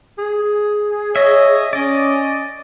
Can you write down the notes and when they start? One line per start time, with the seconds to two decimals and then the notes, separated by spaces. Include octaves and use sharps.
0.18 G#4
1.16 C#5 D#5 E5
1.73 C#4 D5 D#5